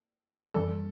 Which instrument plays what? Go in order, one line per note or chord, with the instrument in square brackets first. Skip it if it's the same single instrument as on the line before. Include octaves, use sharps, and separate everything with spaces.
[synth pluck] F#2 E3 G3 [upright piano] A4